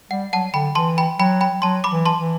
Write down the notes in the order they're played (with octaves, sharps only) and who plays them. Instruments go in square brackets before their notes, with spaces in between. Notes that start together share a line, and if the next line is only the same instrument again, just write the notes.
[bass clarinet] G3 [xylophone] F#5
[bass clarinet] F#3 [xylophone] F#5 A5
[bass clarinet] D3 [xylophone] G5 B5
[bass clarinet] E3 [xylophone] A5 C6
[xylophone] G5 B5
[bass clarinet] F#3 [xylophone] G5 B5
[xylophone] G5 B5
[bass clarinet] F#3 [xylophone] A5 C6
[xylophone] B5 D6
[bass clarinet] E3
[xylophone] A5 C6
[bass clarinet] E3